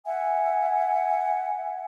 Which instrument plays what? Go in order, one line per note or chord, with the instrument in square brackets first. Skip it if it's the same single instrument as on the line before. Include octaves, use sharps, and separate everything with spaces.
[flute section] E5 F#5 G#5